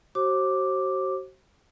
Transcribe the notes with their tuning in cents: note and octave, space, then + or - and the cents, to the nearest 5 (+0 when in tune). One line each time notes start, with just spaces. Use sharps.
F#4 +40 C5 +35 D6 +0